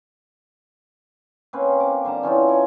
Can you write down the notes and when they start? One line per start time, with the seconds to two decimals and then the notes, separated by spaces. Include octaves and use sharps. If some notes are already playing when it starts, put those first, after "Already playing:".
1.53 A#3 C4 C#4 B4
1.80 D6
2.05 D3 G3 A5 A#5
2.23 E3 C#4 D#4 F4
2.48 C#5 D5 G#5